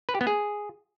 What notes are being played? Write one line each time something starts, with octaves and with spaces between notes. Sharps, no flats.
B4
G4
B3
G#4